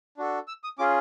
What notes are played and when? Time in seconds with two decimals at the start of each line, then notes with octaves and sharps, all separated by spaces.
0.17 D4 F#4 A4
0.48 E6
0.64 D#6
0.79 C#4 F4 G#4 D6